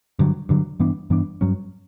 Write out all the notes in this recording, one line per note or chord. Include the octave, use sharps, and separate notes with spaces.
G2 D3 F#3
G2 D3 F#3
G2 E3 B3 D4
G2 E3 B3 D4
G2 F#3 C#4